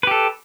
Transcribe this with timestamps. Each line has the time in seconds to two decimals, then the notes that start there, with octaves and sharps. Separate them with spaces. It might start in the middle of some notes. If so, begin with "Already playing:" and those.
0.03 B4
0.07 G4
0.11 A4